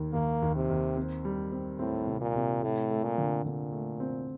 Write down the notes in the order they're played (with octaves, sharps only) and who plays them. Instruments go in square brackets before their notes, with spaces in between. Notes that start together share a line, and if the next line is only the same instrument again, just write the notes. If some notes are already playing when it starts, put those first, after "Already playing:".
Already playing: [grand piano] D#2 D#3
[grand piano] D#2 [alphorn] A#3
[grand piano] D#2
[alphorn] C3
[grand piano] D#2
C4
G3
C4
[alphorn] A2 [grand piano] C4
[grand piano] C3
[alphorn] A#2
[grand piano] C3
[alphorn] A2 [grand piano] A3
[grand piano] A3
[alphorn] A#2
[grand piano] D3
[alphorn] A#2 [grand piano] D3
[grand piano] A3
C4